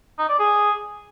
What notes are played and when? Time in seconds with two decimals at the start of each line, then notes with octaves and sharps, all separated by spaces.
0.19 D#4
0.29 D5
0.39 G#4